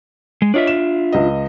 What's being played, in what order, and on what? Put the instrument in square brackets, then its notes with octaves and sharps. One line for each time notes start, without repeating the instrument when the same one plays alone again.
[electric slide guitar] G#3
[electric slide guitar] D4 F4 E5 [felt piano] C#5 D#5
[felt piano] E7
C#2 D#5